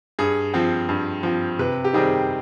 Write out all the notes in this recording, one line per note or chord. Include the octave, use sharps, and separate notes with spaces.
G2 G#4
F3 C4
G2
F3 C4
C3 B4
G4
D#3 G3 C4 G#4